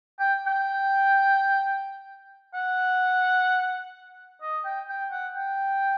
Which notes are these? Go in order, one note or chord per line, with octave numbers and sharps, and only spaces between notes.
G5
G5
F#5
D#5
G5
G5
F#5
G5